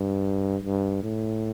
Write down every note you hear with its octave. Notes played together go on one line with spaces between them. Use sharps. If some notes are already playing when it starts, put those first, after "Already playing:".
Already playing: G2
G2
A2